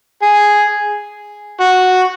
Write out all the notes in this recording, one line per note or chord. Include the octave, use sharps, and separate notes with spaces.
G#4
F#4